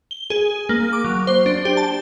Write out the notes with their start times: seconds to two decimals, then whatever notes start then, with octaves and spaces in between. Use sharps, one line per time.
0.11 G7
0.30 G#4
0.69 A#3
0.93 D6
1.05 F#3
1.27 C5
1.46 D4
1.65 G4
1.77 A5